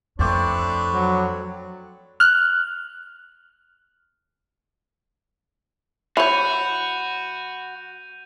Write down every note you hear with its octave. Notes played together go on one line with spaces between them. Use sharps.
F2 A3 C4 D4 B4 C#5 D5
F#3
F6 F#6
E3 F#4 C#5 B5 G6 D#7 F7